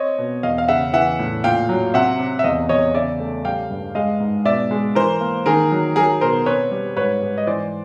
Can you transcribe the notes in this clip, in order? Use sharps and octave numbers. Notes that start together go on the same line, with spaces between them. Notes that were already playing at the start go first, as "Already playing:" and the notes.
Already playing: C4 C#5 D#5
B2
E2 D#5 F5
F5
C#3 E5 F#5
E3 E5 F#5
A2
A#2 F5 G5
F#3
C3 E5 F#5
C3
E5
E2 D#5 F5
E2 C#5 D#5
C#3 D5 E5
A3
G3 F5 G5
G2
G#3 D#5 F5
G#2
B2 D5 E5
G#3
E3 A#4 C5
A#3
D#3 G#4 A#4
F#3
F#3 G#4 A#4
B2 A#4 C5
C4 B4 C#5
G3
G#2 B4 C#5
G#2
D#5
E3 C5 D5